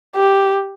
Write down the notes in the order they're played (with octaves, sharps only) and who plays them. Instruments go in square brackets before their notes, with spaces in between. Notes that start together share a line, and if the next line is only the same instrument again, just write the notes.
[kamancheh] G4